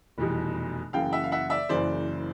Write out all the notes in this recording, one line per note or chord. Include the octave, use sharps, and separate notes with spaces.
F1 E2 B2 G3
F#1 F#2 C#3 E3 F5 G5
E5 F#5
F5
E5 F#5
D5 E5
F#1 F#2 C#3 E3 C5 D5